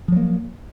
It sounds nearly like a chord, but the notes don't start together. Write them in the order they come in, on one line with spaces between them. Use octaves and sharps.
F3 F#3 A#3